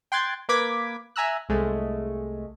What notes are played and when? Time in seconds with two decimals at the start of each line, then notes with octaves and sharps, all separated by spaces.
0.12 G5 C6 F#6 G#6 A6
0.49 A#3 B4 D6 G#6 B6
1.16 E5 G#5 A#5 E6 F#6
1.49 C2 G#3 A3